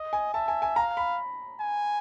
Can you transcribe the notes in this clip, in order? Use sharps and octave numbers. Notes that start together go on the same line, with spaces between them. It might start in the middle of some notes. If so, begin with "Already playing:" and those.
Already playing: D#5
G#5
E5 A5
G#5
G#5
F5 A#5
B5
G#5